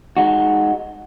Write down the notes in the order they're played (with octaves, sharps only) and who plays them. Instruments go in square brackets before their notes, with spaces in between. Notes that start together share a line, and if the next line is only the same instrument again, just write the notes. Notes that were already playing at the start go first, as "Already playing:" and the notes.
[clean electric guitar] G#3 D#4 F#4